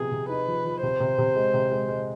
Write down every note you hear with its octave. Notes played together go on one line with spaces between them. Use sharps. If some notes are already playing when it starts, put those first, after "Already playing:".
Already playing: C3 F3 B3 G#4
C3
D#4 B4
F3
F3
C3 C5
C3
C3
G#3
C3
G#3
G#3